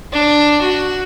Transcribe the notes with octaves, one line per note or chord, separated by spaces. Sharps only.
D4
F#4